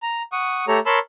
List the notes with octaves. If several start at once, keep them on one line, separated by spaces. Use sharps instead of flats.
A#5
F#5 C#6 D#6
A3 G4 A4 C#5 A#5
A#4 C#5 A5 B5 C6 E6